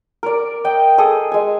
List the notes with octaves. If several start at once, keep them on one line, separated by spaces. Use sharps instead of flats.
A#4 D5
D#5 G5
G#4 A4 D#6
G#3 G#5